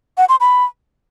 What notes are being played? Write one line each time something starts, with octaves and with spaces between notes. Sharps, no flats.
F#5
C6
B5